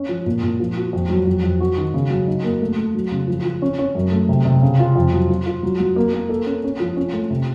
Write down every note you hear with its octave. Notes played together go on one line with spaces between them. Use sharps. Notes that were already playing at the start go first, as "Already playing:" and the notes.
Already playing: C#4
F3
A#2
A#2
F3
F#4
F2
F#3
F2
F2
F#4
D#3
C#3
F#3
D#4
A#3
A3
A3
F#3
C#3
F3
F3
C#4
C#4
F#2
A3
C3
C3
C#3
F4
F2
F#3
F4
F4
F#3
F#3
A#3
A#3
A4
C#4
C#4
F3
C#4
A3
C3